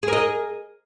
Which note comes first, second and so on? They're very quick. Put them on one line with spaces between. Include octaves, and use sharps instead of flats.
G#4 A#4 D#5